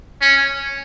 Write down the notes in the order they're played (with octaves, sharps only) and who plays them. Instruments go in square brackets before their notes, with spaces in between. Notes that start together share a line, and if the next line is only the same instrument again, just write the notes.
[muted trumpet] C#4